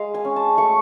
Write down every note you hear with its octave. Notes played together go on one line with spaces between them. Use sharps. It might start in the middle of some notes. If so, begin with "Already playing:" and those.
Already playing: G#3 F5
G#5
C#4
A5
A3 C#6